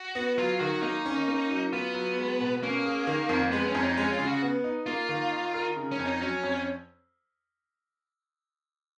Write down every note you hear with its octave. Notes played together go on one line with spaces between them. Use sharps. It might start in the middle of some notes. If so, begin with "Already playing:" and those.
Already playing: F#4
B3
F#3 F4
D#3 F#4
A#3 D#4
C#4
A#3
F#3
B3 F4
F#3
G#3
B2
A#3 C#4
G#4
D#3
F2
G#3 B3
C#4
F2
D#4
G#3 C#4
F4
C#3
F#4
B3
D#4
A#3 F4
D#3
D#4
A#4
C#3
C#4
F2
D#4
F#3 C#4
F2